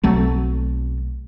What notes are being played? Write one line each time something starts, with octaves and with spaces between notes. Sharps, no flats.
B1 F#3 A3 C4